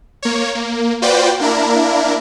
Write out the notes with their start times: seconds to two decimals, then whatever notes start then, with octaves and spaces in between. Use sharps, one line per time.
0.22 A#3 C#5
0.55 A#3
1.02 F4 F#4 B4 C5 D5 G5
1.40 A#3 D4 E4 A#4